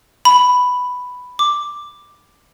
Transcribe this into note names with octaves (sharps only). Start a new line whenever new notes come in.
B5
D6